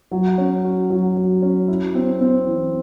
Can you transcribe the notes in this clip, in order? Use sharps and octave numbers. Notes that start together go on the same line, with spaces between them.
F#3
C#4
F#4
F#3
F#3
C#4
E4
C4
C4
E3